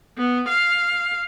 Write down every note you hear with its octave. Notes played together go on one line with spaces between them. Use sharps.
B3
F5